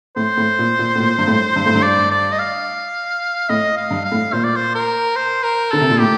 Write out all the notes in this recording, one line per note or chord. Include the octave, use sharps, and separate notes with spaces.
A2 C5
A2
A#2
A#2
A2
A#2
G2
A2
G2
A2
G2
D5
D5
D#5
F5
A2 D#5
F5
G2
F5
A2
A#2 C5
D5
C5
A#4
C5
A#4
D3 A4
C3
A#2
A2 G4